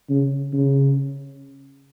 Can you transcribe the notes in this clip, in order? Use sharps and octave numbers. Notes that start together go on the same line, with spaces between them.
C#3
C#3